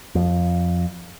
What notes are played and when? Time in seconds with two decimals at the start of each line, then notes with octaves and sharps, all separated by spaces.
0.15 F2